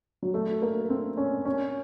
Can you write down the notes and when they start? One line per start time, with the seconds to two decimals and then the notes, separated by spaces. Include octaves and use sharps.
0.23 F#3
0.34 A3
0.62 A#3
0.90 C4
1.17 C#4
1.45 C#4